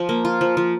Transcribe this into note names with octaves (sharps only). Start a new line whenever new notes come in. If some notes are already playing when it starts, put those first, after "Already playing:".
Already playing: F3
A#3
F4
F3
F3